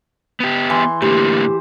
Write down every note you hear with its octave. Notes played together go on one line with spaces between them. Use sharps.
B3 G4
E3 C6
A2 D3 A#3 G4 C5